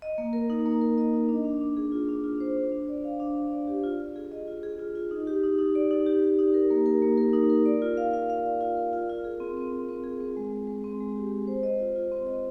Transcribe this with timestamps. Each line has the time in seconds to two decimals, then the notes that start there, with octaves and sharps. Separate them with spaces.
0.02 D#5
0.18 A#3
0.33 A#4
0.50 D#4
0.66 A#3
0.81 A#4
0.98 D#5
1.14 D#4
1.29 D4
1.45 D4
1.61 D4
1.77 G#4
1.92 F4
2.09 D4
2.24 F4
2.40 C5
2.57 D4
2.72 D4
2.88 D5
3.04 F5
3.20 D4
3.35 D4
3.51 D5
3.67 G4
3.84 F4
4.00 F4
4.16 G#4
4.32 D#5
4.47 F4
4.63 G#4
4.79 F4
4.95 F4
5.11 D#4
5.27 G4
5.43 D#4
5.59 D#4
5.75 D5
5.91 D#4
6.06 G4
6.22 G4
6.39 D#4
6.54 A#4
6.70 A#3
6.86 A#4
7.02 A#3
7.18 A#4
7.33 D#4
7.50 A#4
7.66 D5
7.82 F4
7.97 F5
8.13 F5
8.30 F5
8.45 D5
8.61 F4
8.77 A#4
8.93 F4
9.09 F4
9.24 G#4
9.40 C4
9.57 C4
9.72 C4
9.89 C4
10.04 G#4
10.21 C4
10.37 G#3
10.53 G#3
10.67 G#3
10.84 C4
11.01 G#3
11.16 G4
11.32 G#3
11.47 C5
11.63 D#5
11.79 F4
11.96 F4
12.12 C4
12.27 D#5